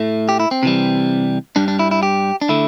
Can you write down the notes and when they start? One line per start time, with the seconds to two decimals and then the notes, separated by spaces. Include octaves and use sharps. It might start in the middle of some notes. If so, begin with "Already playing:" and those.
Already playing: A2 A3
0.29 G4
0.40 E4
0.51 C4
0.63 C3 E3 G3
1.56 G2 G3 D4
1.68 D4
1.79 E4
1.91 E4
2.03 G4
2.41 D4
2.49 D3 A3 E4